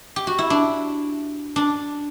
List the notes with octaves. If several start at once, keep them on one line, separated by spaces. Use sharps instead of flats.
G4
F#4
E4
D4
D4